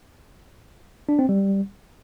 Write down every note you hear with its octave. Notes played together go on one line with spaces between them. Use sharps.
D4
C4
G3